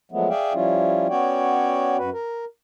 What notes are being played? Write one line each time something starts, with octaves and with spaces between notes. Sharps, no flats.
F3 F#3 G#3 A3 B3
G#4 D5 E5 F5 G5
F3 G3 C#4 E4 F4
B3 C#4 F#4 C#5 D5 G5
F#2 F#4 B4
A#4